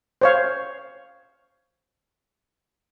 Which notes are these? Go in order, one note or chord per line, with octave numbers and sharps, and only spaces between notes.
C5 C#5 F5